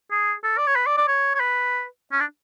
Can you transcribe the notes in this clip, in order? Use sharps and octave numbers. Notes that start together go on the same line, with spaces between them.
G#4
A4
D5
C#5
B4
D5
D5
C#5
C#5
B4
C#4
D4